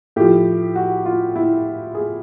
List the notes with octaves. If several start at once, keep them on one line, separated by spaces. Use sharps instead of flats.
A2 F3 G4
F#4
F4
E4
G#4